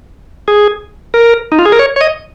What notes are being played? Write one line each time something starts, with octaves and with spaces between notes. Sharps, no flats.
G#4
A#4
D#4
F4
G#4
A#4
C#5
C#5
D#5